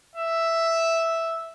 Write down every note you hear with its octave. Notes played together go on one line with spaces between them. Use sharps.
E5